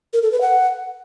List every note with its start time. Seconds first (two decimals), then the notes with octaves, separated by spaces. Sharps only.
0.13 A#4
0.23 A4
0.32 B4
0.41 F#5